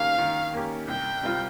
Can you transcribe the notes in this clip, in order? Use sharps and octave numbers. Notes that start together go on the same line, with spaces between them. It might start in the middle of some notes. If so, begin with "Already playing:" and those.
Already playing: D#3 A#3 C#4 G4 F5
D#3
A#3 C#4 G4
C2 G5
C3 G3 C4 F4